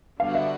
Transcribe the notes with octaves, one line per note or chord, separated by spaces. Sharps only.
D3 G3 B3 D4 F#4 F5
E5